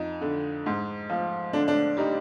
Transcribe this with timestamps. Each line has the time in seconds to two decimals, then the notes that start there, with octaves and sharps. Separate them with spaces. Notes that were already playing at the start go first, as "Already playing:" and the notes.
Already playing: F2 D#4
0.21 D3
0.66 G#2
1.10 F3
1.53 D3 D4
1.68 D4
1.97 G3 D#4